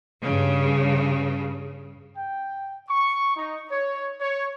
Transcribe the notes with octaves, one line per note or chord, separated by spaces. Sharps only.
G2 C#3
G5
C#6
D#4
C#5
C#5